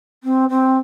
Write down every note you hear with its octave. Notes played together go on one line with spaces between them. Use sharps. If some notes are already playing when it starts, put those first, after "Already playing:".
C4
C4